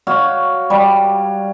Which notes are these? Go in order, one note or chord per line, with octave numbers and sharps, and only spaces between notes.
F#4 C#5 F5
G3